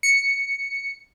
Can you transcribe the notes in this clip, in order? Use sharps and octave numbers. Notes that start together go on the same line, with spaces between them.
C#7